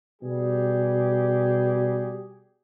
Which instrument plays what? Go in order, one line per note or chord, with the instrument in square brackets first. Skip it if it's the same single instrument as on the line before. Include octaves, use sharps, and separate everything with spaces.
[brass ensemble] B2 G3 G4 G#4